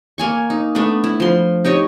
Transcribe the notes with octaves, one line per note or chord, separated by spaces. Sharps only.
A#3 G#5 C#6
D#4
A3 B3 D4 B4
E4
F3 C6
D#4 G4 C#5 D#5